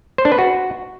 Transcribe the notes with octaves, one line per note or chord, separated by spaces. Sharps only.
C5
D4
B4
F#4